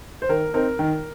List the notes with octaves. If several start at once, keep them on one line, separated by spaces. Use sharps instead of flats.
C5
D#3 A#4
C4 D#4 A#4
D#3